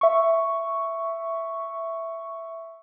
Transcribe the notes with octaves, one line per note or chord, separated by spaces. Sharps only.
E5 C#6